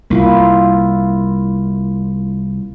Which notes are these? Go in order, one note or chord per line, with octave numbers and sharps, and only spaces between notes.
C2 A#3 E4 F4